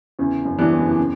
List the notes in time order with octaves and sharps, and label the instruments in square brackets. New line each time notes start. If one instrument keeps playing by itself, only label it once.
[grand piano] E2 [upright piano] C#3
[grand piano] F#2
[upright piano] E3 G3 B3 D4
[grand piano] E2
F#2
E2
[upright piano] C#3